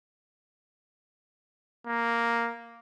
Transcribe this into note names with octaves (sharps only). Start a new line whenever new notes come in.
A#3